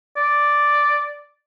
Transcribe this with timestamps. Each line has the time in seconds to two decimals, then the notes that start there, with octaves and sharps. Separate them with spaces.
0.17 D5